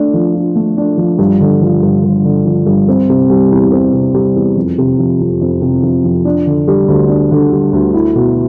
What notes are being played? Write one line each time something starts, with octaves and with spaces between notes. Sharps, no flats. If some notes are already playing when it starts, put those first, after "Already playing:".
Already playing: A3 D4
F3
F4
A3
D4
F3
G2
D3
F3
G2
G2
D3
F3
G2
C4
C3
G3
E2
C4
C3
G3
E2
F2
C3
F3
F2
F2
C3
F3
F2
D4
D3
G3
D2
D4
D3
G3
D2
E4
B2